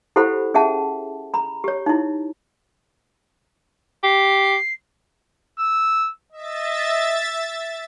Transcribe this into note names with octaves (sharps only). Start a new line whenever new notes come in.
E4 G4 A4 C5 F#5 B5
C#4 G#4 E5 F#5 A5
A#5 B5
G4 C#5
D#4 E4
G4 C7
E6
D#5 E5 A6